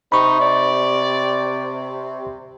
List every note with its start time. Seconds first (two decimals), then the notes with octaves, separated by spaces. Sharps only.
0.12 C3 D#4 B5 C#6
0.41 D5